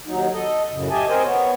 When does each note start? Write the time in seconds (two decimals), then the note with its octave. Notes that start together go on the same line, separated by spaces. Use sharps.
0.07 D#2 F#3 D#4
0.33 A4 D#5
0.72 F#2 A2 C#3
0.90 G4 D#5 E5 G#5 A5
1.09 C4 A#4 C5 D#5 G#5
1.25 B3 C#5